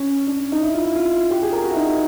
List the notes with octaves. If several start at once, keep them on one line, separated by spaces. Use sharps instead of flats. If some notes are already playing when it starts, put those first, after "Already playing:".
Already playing: C#4
D4
D#4
E4
F4
E4
F4
G4
G#4
A#4
F#4
E4
D#4